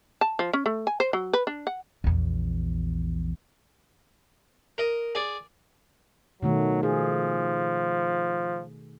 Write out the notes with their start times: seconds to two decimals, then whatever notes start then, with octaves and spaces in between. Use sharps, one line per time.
0.21 A5
0.39 F3
0.53 C#4
0.66 A3
0.87 G#5
1.00 C5
1.13 F#3
1.33 B4
1.47 D4
1.67 F#5
2.04 A#1 E2
4.78 A#4 D#5
5.15 G#4 D5
6.42 B2 D#3 F#3 A3
6.83 F3 G#4